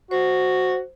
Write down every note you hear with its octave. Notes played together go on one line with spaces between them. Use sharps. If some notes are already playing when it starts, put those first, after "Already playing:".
F#4 C5